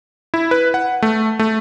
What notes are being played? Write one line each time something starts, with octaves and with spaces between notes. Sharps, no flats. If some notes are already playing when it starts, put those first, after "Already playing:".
E4
B4
F#5
A3
A3